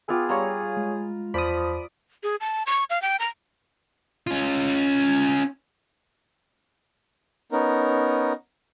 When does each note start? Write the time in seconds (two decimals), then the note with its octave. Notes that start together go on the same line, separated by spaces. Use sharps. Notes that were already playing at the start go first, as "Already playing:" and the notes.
0.09 B3 F4 G#4 G5 D6 E6
0.29 G3 F4 C#5 A#5
0.77 G#3
1.34 E2 F3 D5 B5 D#6
2.23 G#4
2.40 A5
2.67 C#6
2.90 F5
3.02 G5
3.20 A#5
4.27 C#4 F4
7.52 B3 C#4 D#4 A#4